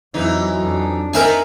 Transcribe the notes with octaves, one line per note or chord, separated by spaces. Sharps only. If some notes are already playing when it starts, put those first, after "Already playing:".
F2 E3 F#3 D#4 E4
F2 D4
B3 C4 D#4 A#4 E5 G#5